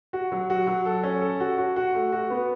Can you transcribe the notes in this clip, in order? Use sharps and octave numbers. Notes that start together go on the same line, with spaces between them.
F#4
F#3
F#4
F#3
A4
C#4
A4
F#4
F#4
F#4
A3
F#4
B3